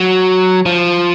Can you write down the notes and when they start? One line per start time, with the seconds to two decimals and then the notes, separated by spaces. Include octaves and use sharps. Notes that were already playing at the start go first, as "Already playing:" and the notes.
Already playing: F#3
0.66 F3